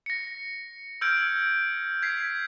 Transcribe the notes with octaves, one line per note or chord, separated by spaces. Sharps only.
A#6 C#7
E6 F6 G6 G#6 D7
G#6 B6 C7